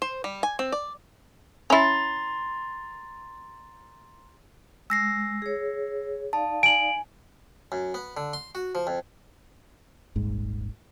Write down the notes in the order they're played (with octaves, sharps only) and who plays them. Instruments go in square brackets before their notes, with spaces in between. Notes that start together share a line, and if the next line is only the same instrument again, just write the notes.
[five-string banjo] C5
G3
G#5
C4
D5
[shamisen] C#4 E4 [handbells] A#5 C6 A6
[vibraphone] G#3 [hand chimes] E6 A#6 C7
[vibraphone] G#4 C#5
[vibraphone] D#4 D5 F5 [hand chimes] A5
[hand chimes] G#5 [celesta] D7 F#7
[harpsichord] F#2
B3
D3
C6
F#4
F3
F2
[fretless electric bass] D#1 G#1 G#2